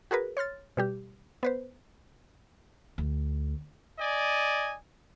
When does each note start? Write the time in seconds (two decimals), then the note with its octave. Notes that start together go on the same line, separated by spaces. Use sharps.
0.11 F#4 G#4 A#4 B4
0.37 C#5 C6 F6 A6
0.77 B2 G3 G4
1.43 B3 B4 C5
2.98 D2
3.98 D5 D#5 G#5